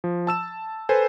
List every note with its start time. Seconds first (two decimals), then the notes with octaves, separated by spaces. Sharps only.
0.04 F3
0.27 A5 E6 E7
0.89 A4 B4 C5 G#5